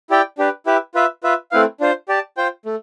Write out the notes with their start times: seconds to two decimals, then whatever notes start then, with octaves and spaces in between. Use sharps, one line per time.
0.10 E4 G4 D5 G5
0.38 D4 G4 B4
0.66 E4 G4 B4 E5
0.95 F4 B4 E5
1.23 F4 B4 E5
1.52 A3 C4 E4 B4 F5
1.80 D4 F4 C5
2.09 G4 D5 A5
2.37 F4 C5 G5
2.66 A3